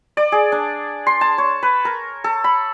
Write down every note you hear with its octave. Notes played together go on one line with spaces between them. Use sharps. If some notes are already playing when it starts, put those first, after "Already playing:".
D5
G#4
D4
C6
A5
C#5
B4
A#4
A4
B5